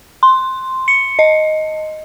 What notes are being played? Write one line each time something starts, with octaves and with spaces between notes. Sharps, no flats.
C6
C#7
D#5